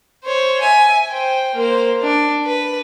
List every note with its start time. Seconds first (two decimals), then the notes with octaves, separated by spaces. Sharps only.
0.24 C5 C#5
0.61 E5 G#5
1.09 C5 G5
1.55 A#3 C5
2.02 D4
2.46 B4